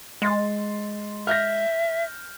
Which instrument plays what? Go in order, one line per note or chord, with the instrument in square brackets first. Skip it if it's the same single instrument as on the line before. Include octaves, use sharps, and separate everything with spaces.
[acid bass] G#3 [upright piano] C6 A6
[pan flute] E5 [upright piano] F6 G6 A#6